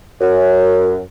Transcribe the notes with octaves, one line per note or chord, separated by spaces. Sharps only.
F#2